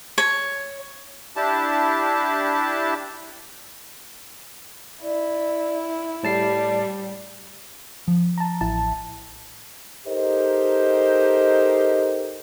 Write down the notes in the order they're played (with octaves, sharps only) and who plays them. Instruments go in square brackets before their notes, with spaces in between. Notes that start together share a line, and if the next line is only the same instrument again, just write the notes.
[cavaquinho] C#5
[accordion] D4 E4 G4 A5
[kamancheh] E4 [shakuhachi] D5
[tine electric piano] A2 A5 C7 [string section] G3 [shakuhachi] D5
[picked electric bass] F3
[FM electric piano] A5 A#5
A1 E4 A5
[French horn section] D#4 G4 A4 A#4 C5 D#5